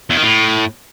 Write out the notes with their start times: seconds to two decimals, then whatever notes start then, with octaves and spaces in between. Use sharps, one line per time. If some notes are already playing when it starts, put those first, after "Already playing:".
0.10 E2
0.16 D#3
0.23 A2